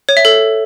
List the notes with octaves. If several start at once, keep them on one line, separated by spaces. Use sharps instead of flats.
C#5
E5
A4